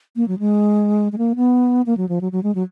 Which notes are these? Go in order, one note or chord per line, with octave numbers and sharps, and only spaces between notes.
A#3
F#3
G#3
G#3
A#3
B3
A#3
F#3
F3
F#3
F#3
G#3
F#3